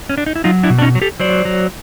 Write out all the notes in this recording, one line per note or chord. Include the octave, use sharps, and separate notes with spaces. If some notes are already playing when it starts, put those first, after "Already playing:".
C#4
D4
D#4
E4
F#3 D#4 F4
D4 E4
B2
D4
C#4 D#4
F#3
G4 A4
F#3 C5 D5
F#3